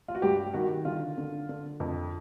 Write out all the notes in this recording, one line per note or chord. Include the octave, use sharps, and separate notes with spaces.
F4
F#4
G2 G4
D#3 F#4
D3 F4
D3
D3
F2